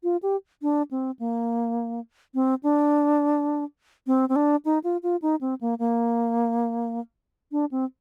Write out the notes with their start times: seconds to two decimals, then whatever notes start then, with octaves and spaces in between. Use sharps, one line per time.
0.03 F4
0.23 G4
0.62 D4
0.91 C4
1.19 A#3
2.34 C4
2.63 D4
4.07 C4
4.29 C4
4.36 D4
4.65 D#4
4.84 F4
5.03 F4
5.22 D#4
5.41 C4
5.61 A#3
5.79 A#3
7.52 D4
7.71 C4